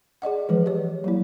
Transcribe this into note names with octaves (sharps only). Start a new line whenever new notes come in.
G#4 D5 D#5 F#5
E3 F3 G#3 G#4 B4
G4 C#5
F#3 A#3 E4